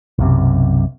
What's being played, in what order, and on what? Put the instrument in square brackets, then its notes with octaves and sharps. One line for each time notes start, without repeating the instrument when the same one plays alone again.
[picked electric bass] B1 F#2 C3